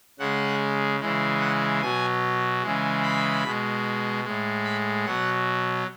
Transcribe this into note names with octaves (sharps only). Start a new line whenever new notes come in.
C#3 G#3 F#5
C#3 E3 G#3
F#5
B2 F#3 G#5
C#3 E3 G#3
B5
B2 G#3
A2 G#3
B5
B2 F#3 F#5